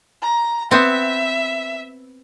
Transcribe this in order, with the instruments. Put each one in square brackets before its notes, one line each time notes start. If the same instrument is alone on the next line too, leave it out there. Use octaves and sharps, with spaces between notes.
[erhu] A#5
[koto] B3 C4 [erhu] E5